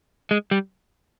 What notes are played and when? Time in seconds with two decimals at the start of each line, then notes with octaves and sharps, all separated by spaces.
0.31 G#3
0.51 G3